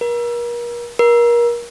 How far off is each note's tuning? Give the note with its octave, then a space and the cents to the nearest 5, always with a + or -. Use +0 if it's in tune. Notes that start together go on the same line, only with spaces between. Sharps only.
A#4 +40
A#4 +30